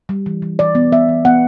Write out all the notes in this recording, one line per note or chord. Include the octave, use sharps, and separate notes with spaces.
G3
E3
E3
E3 D5
B3
B3 E5
E3
B3 F#5